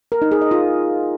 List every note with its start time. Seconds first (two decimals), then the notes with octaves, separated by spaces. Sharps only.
0.12 A#4
0.22 D#4
0.32 G#4
0.41 D#5
0.51 F4